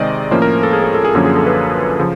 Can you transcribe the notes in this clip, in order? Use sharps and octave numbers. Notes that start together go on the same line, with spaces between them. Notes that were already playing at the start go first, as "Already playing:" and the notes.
Already playing: C3 D#3 G#3 C4 D5 D#5
A2 F3 A#3 C#4 C5
A#4
A4
G#4
A4
A4
G#4
F#2 D3 F3 A#3 C#4 G#4
G#4
A4
B4
C#3 F3